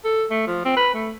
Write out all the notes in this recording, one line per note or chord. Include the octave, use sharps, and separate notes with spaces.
A4
A3
F3
C4
B4
A3